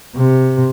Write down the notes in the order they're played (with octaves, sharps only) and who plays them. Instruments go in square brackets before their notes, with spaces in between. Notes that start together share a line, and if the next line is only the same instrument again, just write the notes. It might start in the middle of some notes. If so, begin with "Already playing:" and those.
[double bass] C3